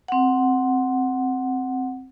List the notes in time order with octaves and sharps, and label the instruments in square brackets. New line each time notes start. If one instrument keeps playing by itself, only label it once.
[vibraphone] C4 F#5